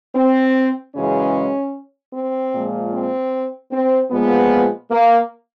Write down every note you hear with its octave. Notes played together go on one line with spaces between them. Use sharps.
C4
F#2 C#3 E3 G#3 C#4
C4
A#2 F3 G#3
C4
C4
A#2 F3 G#3 B3
A#3